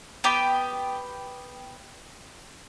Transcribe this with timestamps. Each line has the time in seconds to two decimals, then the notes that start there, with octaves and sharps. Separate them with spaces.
0.24 B3 G4 G5 D6